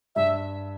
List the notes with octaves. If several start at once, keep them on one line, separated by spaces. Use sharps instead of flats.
G2 E5